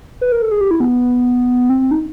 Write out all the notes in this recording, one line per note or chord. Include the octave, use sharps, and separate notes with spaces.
B4
A#4
A4
G#4
G4
E4
B3
C4
D#4